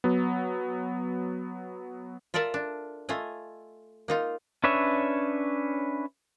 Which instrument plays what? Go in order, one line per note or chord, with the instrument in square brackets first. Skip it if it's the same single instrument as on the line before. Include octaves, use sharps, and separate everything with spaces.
[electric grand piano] F#3 B3
[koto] F4 A4 A#4 D5 E5
D4
A3 F4 D#5 G#5
A#3 D#4 F4
[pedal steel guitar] C#4 D4 B4 C#5 E5